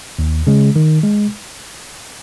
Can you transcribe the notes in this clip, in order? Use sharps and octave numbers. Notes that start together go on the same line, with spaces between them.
D#2
C#3 G#3
D#3
G#3